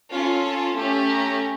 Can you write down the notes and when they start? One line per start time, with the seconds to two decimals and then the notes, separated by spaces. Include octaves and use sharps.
0.11 C#4 F4 A4 F5
0.44 A5
0.76 A3 C#4 G4
1.08 A#5